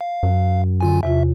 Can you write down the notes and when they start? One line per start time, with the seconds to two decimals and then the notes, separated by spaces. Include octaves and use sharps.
0.01 F5
0.23 F#2
0.81 D3 F4 G#5
1.03 E2 C3 F4 E5